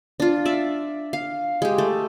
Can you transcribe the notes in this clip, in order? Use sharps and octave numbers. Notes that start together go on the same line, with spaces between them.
D4 F4
D5 E5
F5
G#3 G4
A3